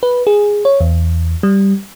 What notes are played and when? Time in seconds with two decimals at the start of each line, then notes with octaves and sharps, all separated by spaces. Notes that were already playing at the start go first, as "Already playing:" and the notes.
0.03 B4
0.27 G#4
0.65 C#5
0.80 E2
1.43 G3